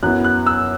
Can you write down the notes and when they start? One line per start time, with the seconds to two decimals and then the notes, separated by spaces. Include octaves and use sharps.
0.03 F#2 F#3 B3 E4 F#6
0.24 F#6
0.46 E6